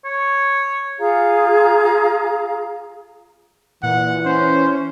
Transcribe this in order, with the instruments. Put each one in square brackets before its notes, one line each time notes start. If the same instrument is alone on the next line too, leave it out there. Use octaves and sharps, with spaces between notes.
[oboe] C#5
[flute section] F4 G#4 F5 A#5
[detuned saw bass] A#2 [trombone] E3 [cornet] F#5
[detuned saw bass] C#4 [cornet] C5